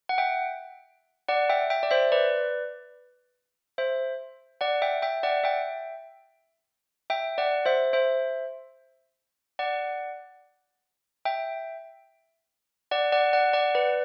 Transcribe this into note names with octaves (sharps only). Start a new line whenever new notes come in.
F#5
E5 G5
D5 F#5
E5 G5
E5 G5
D5
C5 E5
B4 D5
C5 E5
D5 F#5
E5 G5
E5 G5
D5 F#5
E5 G5
E5 G5
D5 F#5
C5 E5
C5 E5
D5 F#5
E5 G5
D5 F#5
D5 F#5
D5 F#5
D5 F#5
B4 D5